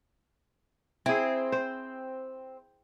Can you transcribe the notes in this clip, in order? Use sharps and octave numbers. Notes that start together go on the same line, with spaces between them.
C4 E4 G#4
C5